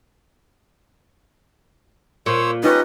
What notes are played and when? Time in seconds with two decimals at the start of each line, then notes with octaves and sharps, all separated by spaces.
2.26 A#2 C5 C#5 E6
2.64 C#4 D#4 F4 G4 B4 D#5 C#6